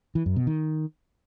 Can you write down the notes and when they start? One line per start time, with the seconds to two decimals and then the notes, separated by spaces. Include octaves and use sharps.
0.15 E3
0.26 F#2
0.36 B2
0.47 D#3